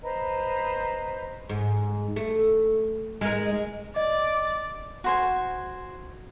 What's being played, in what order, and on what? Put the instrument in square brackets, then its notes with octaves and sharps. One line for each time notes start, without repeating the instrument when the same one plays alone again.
[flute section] B4 C5 D#5 A#5
[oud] G#2
A3
G#3 D#4 A#4
[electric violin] D5 [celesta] D#5
[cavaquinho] F#4 C5 G#5